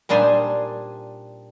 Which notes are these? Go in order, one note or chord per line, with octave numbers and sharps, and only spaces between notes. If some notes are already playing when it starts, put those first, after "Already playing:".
A#2 G3 D4 D#4 C5 G#5